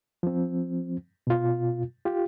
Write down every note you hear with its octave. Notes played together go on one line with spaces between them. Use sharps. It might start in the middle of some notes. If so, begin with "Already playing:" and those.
F3 C4
B2 F4
F4 G4